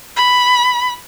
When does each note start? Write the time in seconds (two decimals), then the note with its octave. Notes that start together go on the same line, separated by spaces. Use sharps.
0.16 B5